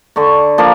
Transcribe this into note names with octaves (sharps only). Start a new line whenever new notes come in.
D3 C#6
F3 A#3 D4